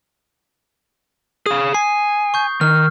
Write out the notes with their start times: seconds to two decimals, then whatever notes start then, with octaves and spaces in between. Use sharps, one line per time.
1.46 G#4 F5 D#6
1.74 G#5 C7
2.34 C#6 G6
2.61 D#3 F6